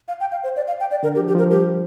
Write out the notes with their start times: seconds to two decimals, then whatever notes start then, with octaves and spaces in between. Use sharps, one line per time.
0.08 F5
0.20 G5
0.32 F5
0.43 C5
0.56 D5
0.68 F5
0.80 G5
0.91 D5
1.03 D3 A#4
1.15 G4
1.19 F3
1.28 G4
1.35 F3 A#4
1.51 G3 G4